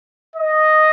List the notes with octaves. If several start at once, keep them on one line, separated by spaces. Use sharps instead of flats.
D#5